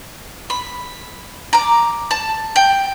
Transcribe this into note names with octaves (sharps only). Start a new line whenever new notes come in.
B5
A#5 D6
A5
G5